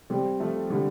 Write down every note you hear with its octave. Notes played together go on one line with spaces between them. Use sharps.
G3 C4
F3 A3
D3 G3